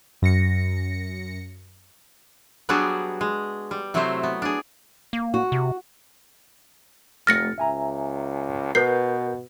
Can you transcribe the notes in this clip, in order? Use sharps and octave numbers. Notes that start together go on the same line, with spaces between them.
F#2 A#6 C#7
F#3 G3 B3 D4 F#4 G#4
G#3
G3
C3 F#3 A3 C4 E4 C5
B3
D4 G#4
A#3
F#4
C3
F1 A3 F6 A6 A#6 C#7
C#2 E5 G#5 A#5
B2 A#4 B4 G6 C7